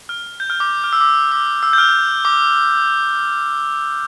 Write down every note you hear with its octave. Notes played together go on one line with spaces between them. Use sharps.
F6
G6
F6
D6
F6
E6
D6
D6
E6
G6
F6
D6